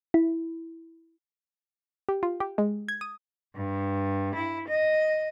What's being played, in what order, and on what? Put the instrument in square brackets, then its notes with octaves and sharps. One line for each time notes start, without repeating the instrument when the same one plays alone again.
[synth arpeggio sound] E4
[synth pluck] G4
F4
G4
G#3
G#6
D#6
[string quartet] G2
E4
D#5